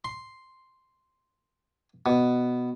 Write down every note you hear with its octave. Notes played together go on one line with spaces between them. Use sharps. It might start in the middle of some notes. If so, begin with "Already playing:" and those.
C6
B2